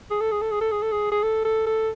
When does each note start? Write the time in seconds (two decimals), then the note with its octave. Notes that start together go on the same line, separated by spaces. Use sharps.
0.11 G#4
0.20 A4
0.31 G#4
0.41 A4
0.51 G#4
0.61 A4
0.72 G#4
0.82 A4
0.92 G#4
1.11 G#4
1.22 A4
1.45 A4
1.66 A4